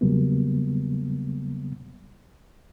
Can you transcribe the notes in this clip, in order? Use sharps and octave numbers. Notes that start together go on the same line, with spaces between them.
E2 C#3 F#3 G3 A#3 B3